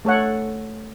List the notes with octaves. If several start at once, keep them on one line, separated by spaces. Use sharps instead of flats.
A3 A4 C#5 F#5